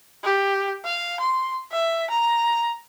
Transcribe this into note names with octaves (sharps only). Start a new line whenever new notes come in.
G4
F5
C6
E5
A#5